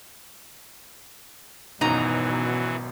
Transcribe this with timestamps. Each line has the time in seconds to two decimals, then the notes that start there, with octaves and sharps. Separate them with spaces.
1.81 G#1 F#2 B2 E3 F#3 D#4 A#5